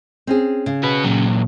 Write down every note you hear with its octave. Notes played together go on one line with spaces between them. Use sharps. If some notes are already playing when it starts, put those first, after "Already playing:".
C4 C#4 G#4
C#3
F#4 B4
A#2 F#3